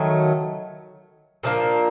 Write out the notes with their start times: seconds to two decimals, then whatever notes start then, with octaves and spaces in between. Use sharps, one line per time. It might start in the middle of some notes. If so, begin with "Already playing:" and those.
Already playing: D#3 F#3 A3
1.43 A#2 F3 A#3 D4